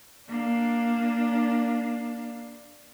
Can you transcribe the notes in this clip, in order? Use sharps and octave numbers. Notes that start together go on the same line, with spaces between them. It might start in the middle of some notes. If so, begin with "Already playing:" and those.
A#3 D4